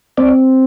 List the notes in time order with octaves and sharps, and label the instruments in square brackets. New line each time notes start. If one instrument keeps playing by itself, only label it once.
[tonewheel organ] C4 D5